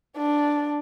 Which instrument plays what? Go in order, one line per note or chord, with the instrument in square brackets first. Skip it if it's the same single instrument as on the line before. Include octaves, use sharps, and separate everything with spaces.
[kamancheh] D4